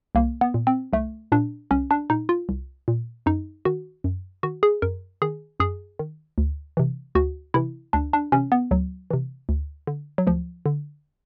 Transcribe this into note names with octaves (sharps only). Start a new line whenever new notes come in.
C2 A#3
B3
A#2
C4
C2 A3
A#2 D4
C2 C#4
D4
A#2 D#4
F4
C2
A#2
F#2 D#4
D#3 F#4
F#2
D#3 F#4
G#4
F#2 A#4
D#3 G#4
F#2 G#4
D#3
D2
C3 E3
D2 F#4
C3 E3 E4
D2 D4
D4
C3 E3 C#4
B3
D2 F#3
C3 E3
D2
D3
F#3
D2 F3
D3